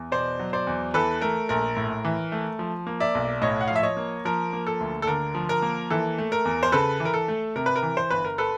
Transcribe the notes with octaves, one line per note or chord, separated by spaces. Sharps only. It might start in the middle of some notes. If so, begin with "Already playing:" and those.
Already playing: E2
B2 C5 D5
F#3
C5 D5
E2
E3 A4 B4
A3 A#4
A#1 A#4
A2
E3
A3
F3
A#3
D5 E5
B1
A2 C#5 D#5
F#5
F5
F3
E5
C#5 D#5
A#3
F3 A#4
A#3
A4
D2
A4
D3 A#4
F3
A#4
A#3
E3 A4
A3
A#4
E2
C5
C#3 A4 B4
E3
A#4
A4
A3
C3 A#4
B4
A#4
E3
C5
G1 B4
A#4
A4 B4